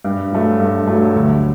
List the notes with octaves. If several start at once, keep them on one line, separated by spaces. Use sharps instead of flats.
G2
F#3 A3
G2
F#3 A3
D2